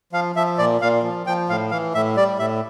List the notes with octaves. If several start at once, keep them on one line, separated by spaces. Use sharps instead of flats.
F3 F5
F3 E5
A#2 D5
A#2 F5
F3
F3 G5
A2 F5
E3 F5
A2 E5
G3 D5
A2 E5